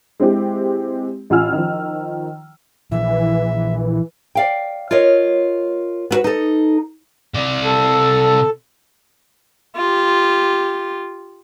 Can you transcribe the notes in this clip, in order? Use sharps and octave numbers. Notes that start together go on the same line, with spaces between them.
G#3 C4 E4 G4
A1 F4 F#5 G#5 E6 F6
D#3 F3
A#2 E3 F3 E5
D5 F5 G5
F4 A#4 C#5 D#5
B3 F#4 B4
D#4 A4
C3 D5
A4
F4 G4